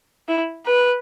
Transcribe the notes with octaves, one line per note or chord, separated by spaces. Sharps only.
E4
B4